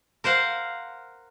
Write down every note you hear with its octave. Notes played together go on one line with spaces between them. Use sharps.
A#4 C5 F5 F#5